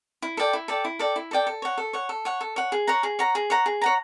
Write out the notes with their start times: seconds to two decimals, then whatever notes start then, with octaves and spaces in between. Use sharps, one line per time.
0.22 E4
0.37 A4 D5 G5
0.53 E4
0.68 A4 D5 G5
0.85 E4
0.99 A4 D5 G5
1.16 E4
1.31 A4 D5 G5
1.47 A4
1.62 C#5 F#5
1.78 A4
1.93 C#5 F#5
2.09 A4
2.25 C#5 F#5
2.41 A4
2.56 C#5 F#5
2.72 G#4
2.87 C#5 F#5 A#5
3.03 G#4
3.19 C#5 F#5 A#5
3.35 G#4
3.50 C#5 F#5 A#5
3.66 G#4
3.82 C#5 F#5 A#5